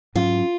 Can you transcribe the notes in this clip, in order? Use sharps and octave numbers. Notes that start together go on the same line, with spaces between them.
G#2 F#3 C#4 F4